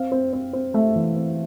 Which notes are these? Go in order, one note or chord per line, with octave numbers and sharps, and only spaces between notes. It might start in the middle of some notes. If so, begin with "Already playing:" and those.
Already playing: C4 F5
C4
C4
C4
A3 E5
E3
C4